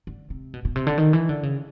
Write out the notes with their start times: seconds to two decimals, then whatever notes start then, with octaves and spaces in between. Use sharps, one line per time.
0.07 D3
0.30 C3
0.54 B2
0.65 B2
0.76 C3
0.87 D3
0.98 D#3
1.13 E3
1.29 D3
1.43 C#3